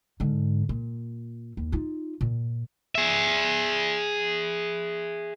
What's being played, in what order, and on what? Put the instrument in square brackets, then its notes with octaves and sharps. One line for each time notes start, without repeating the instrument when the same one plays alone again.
[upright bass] G#2 D3
A#2
D#2
D#4 F4
A#2
[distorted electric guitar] G#4 E5